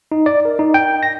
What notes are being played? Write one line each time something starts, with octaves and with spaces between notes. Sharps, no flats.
D#4
D5
A#4
D#4
G5
A#6